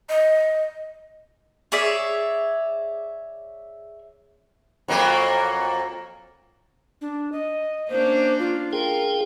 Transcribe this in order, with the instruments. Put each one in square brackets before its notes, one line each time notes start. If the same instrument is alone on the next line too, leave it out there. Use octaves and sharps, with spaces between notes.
[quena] D#5
[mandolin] G#4 C#5 D5 E5
[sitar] F2 F#3 A#3
[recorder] D4
D#5
[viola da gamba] A#3 C#4 D4 [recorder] C5
[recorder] F4
[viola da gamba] F4 [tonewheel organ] G#4 G5 [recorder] A#4